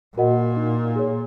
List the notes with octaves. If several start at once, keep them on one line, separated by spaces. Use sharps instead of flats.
A#2 F#4 A#4 D#5 F#5
D#4
G#4 C#5